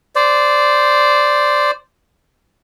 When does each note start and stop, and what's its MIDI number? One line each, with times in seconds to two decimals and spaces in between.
0.15 1.71 72
0.15 1.71 74